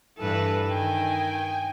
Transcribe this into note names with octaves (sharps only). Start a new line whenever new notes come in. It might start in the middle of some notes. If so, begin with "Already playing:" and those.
G2 E3 A4 B4
D#3 G5 G#5